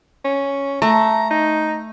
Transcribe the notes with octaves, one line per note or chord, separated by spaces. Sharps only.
C#4
A3 A#5
D#4